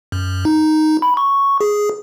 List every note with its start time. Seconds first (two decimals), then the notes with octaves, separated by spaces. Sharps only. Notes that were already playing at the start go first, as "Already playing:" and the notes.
0.12 F#2
0.45 D#4
1.02 B5
1.17 C#6
1.61 G#4